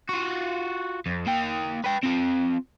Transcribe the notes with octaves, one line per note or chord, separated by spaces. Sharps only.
F4 F#4
F2
A#3 G5
B4 G5
C4 F4